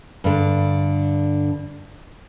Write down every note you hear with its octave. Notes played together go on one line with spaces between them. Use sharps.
G2 D3